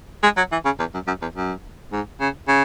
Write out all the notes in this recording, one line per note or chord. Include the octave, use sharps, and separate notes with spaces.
G#3
F#3
E3
C#3
E2
F#2
F#2
E2
F#2
G#2
C#3
C#3